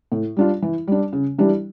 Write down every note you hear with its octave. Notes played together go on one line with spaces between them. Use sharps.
A2
G3 D4 F4
E3
G3 D4
C#3
E3 G3 D4 G4